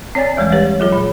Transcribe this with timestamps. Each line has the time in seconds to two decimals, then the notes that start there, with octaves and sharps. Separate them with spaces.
0.15 C4 C#5 D5 G#5 A6
0.37 D#2 E3 G3 G#3
0.52 G4 B4 C#5 A6
0.80 F#3 F4 G#4 C#5
0.92 A#2